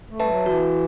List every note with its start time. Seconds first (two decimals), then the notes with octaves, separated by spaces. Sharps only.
0.09 A3
0.20 G3 B4 E5 A5
0.28 F#3
0.45 E3 F#4